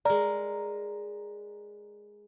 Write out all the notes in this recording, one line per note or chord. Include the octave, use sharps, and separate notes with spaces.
G#3 A#4 D5 A#5